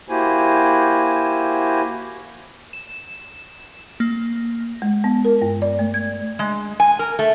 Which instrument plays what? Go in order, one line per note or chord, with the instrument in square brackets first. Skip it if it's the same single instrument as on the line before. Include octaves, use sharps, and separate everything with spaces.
[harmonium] A#3 E4 F#4 G4 C5 G#5
[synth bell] E7
A#3
[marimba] G#3
B3
A#4
G2
D5
A3
G#6
[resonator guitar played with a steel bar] G#3
G#5
A#4
A3